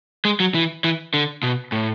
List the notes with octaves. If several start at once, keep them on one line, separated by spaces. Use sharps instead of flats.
G#3
F#3
E3
E3
D3
B2
A2